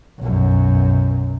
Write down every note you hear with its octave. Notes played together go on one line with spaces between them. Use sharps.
B1 F#2